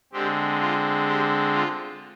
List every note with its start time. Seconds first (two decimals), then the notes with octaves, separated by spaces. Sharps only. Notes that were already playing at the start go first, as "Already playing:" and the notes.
0.13 D3 G#3 C4 G4
0.60 F4
1.08 G4
1.54 F4